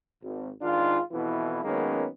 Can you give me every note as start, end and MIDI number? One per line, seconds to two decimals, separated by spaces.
0.22 0.48 32
0.61 0.99 44
0.61 0.99 51
0.61 0.99 62
0.61 0.99 65
1.11 1.61 41
1.11 1.61 47
1.11 1.61 52
1.11 1.61 64
1.63 2.06 42
1.63 2.06 51
1.63 2.06 56
1.63 2.06 58
1.63 2.06 59
1.63 2.06 61